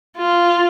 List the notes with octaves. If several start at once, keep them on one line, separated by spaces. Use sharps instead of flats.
F4